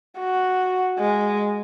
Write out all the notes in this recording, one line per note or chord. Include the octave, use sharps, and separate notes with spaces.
F#4
G#3